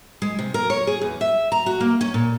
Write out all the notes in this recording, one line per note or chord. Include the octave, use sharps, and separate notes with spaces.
G#3
C3
A#4
C#5
G#4
E2
E5
A#5
F#4
A#3
C#4
A#2